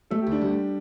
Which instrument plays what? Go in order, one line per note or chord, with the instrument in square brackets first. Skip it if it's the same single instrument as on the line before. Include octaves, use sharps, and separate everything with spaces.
[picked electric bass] A3 [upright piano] A4
[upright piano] G4
[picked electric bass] D2
[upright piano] D4
[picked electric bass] D2 [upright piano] G3